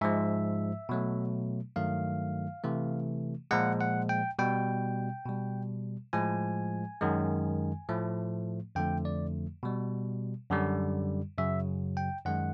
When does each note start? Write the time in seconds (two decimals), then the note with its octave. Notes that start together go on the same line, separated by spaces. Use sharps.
0.01 G#2 F3 G#3 E5
0.89 B2 F#3 A3
1.76 G2 D#3 F#3 A3 F5
2.64 C3 E3 A3
3.51 A#2 F3 G#3 F#5
3.81 F#5
4.09 G5
4.39 B2 G3 G5
5.26 B2 G3
6.13 A2 F3 G#3 G#5
7.01 F#2 D#3 G#3
7.89 A2 F3 A3
8.75 F2 D3 F3 A3 G5
9.05 D5
9.63 B2 G3
10.50 F#2 D3 G3
11.38 F#2 C#3 F#3 E5
11.97 G5
12.25 F#2 D#3 G#3 F#5